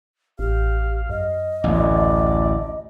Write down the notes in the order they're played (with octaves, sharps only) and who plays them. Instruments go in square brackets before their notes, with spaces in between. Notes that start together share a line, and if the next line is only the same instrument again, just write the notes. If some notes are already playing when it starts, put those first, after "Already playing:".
[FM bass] A1 [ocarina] G4 [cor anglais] F5
[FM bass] F#2 [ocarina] D#5
[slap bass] A1 D2 [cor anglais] D5